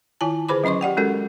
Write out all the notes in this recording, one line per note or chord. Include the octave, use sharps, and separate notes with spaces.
D#3 E4 F4 G#5 A5
D3 G#4 B4 C5 B5 D6
F#3 C#4 D#5 C6 C#6
G4 D5 F#5 G5
G#3 C#4 F#4 A4 A#4